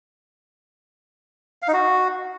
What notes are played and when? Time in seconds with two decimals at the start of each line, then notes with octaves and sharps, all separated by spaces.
1.62 F5
1.68 D#4
1.73 F#4